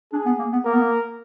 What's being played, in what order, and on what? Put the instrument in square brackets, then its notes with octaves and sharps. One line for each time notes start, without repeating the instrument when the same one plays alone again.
[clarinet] D4 [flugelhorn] G#4
[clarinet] B3
A#3
B3
[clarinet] A#3 [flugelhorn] A#4
[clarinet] B3
A#3